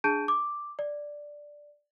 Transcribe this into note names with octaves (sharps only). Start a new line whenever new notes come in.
D4 G#4 A5 G6 D7 D#7
D6
D5